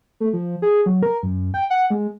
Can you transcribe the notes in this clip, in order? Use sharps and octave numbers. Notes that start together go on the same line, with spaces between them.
A3
F3
G#4
F#3
A#4
F#2
G5
F#5
G#3